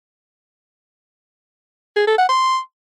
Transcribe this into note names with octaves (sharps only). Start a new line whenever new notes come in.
G#4
A4
F#5
C6